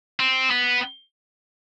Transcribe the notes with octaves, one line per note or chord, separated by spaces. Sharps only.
C4
B3